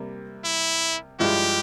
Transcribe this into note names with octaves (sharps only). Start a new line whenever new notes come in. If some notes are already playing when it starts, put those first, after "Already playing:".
Already playing: C3 G3 A#3
E4
G2 F3 G#3 E4 G4